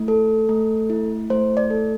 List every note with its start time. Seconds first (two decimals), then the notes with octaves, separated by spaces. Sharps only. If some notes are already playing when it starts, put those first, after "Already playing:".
Already playing: A3 E4
0.08 A4
0.49 A3
0.90 E4
1.30 A3 C5
1.57 D5
1.70 A4